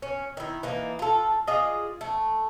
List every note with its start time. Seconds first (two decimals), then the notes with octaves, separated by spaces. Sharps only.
0.02 C#4
0.37 D#3 E4
0.63 E3 A#3 D#4
0.99 F4 A4
1.47 F4 G#4 D5 D#5
2.01 A3